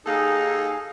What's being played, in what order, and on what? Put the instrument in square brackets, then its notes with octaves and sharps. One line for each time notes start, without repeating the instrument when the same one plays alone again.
[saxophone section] D#2 A4 F5 [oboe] D#4 [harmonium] G#4